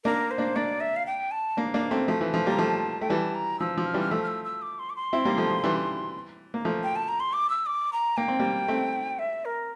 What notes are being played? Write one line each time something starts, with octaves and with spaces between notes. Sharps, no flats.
A#3 D4 A#4
C5
A#3 D4
A#3 D4 D5
E5
F5
G5
A5
A#3 D4
A#3 D4
A3 C4
F3 A3
E3
F3 A3
G3 A#3 A#5
F3 A3 A5
A3 G5
E3 G3 A5
A#5
F3 E6
F3
F6
E3 G3
F6
F3 A3 E6
F6
E6
E6
D6
C6
D6
C6
C4 E4
G3 A#3
F3 A3
F3
E3 G3
A#3
F3 A3
G5
A5
A#5
C6
D6
E6
D6
A#5
A#3 G5
C4
G3 A#3
A3 C4
E5
A#4